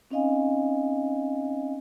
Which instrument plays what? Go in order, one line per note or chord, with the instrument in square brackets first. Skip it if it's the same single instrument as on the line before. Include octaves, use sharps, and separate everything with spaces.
[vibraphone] C4 C#4 D#4 D#5 F5 G#5